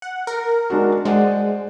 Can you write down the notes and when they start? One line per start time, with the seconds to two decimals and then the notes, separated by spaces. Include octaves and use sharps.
0.02 F#5
0.27 A#4
0.70 G#3 D4 F#4
1.05 G#3 C5 D5 F#5